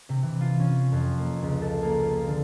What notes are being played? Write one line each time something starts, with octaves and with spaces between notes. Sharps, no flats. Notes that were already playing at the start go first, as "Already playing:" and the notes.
C3
E3
F4
C#4
F2
A#3
C#2
A4
A#3
F4
D3